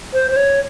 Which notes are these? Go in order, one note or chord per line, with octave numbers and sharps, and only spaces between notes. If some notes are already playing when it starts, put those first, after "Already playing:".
C5
C5
C#5